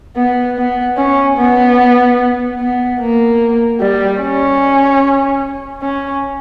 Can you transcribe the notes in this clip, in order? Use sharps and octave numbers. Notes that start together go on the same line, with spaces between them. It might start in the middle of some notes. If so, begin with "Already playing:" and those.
B3
B3
C#4
B3
B3
A#3
G3
C#4
C#4